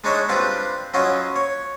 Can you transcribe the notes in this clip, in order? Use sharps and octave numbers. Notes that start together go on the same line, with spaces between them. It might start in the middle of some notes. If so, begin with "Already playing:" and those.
G#3 D4 D#4 C#5 D#5 E5
G3 C4 D4 F4 G4 B4
F#3 C#4 E4 F4 D#5
C#5